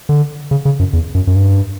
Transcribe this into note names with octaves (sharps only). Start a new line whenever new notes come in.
D3
C#3
C#3
F#2
E2
F#2
F#2
G2